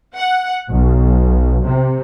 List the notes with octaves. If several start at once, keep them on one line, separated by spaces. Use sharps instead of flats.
F#5
B1
C3